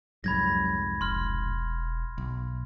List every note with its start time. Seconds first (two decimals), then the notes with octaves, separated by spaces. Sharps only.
0.24 C2 F2 G#2 F#3 B5 G#6 A#6
1.01 E1 C6 F6
2.18 B1